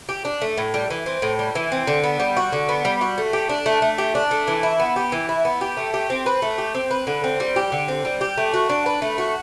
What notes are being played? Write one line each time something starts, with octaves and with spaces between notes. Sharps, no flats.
G4
D4
A3
A2
G3
E3
C4
A2
G3
E3
C4
D3
B3
G3
F#4
D3
B3
G3
F#4
A3
G4
D4
A3
A3
G4
D4
A3
E3
E4
B3
G4
E3
E4
B3
G4
A3
G4
C4
B4
A3
G4
C4
B4
D3
C4
G3
G4
D3
C4
G3
G4
A3
F#4
D4
B4
A3
F#4